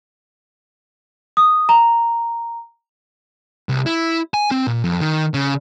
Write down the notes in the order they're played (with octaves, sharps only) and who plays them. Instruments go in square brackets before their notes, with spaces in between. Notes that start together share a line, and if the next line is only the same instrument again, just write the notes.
[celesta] D#6
A#5
[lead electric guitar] C2
E4
G#5
C4
A#2
F2
D#3
C#3